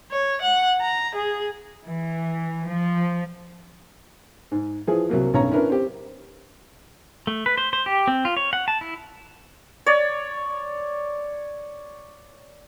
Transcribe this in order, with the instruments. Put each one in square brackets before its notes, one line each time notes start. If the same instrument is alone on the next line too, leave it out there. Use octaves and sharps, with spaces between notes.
[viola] C#5
F#5
A#5
G#4
[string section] E3
F3
[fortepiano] G#2
E3 F3 G#4
C2 F#3 A#3
B1 G2 C#4 C#5 A#5
C#4 D4 E4 A#4 B4
C4 G4
[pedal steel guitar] A3
B4
C5
C5
G4
C4
F4
C#5
F#5
A5
E4
[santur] C#5 D5